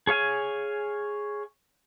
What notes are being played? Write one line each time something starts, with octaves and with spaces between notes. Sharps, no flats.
G#4 C#5 F5 G#5